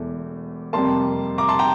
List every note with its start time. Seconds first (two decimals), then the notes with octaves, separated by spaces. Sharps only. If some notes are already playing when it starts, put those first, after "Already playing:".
Already playing: E1 E2 E3 A3
0.73 F2 C3 G3 A#3 A5 C6
1.38 A#5 D6
1.48 A5 C6
1.59 G5 A#5